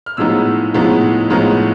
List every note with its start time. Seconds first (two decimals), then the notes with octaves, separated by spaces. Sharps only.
0.06 F6
0.17 A2 F3 G#3 B3 D#4 E6
0.74 A2 F3 G#3 B3 D#4
1.30 A2 F3 G#3 B3 D#4 F6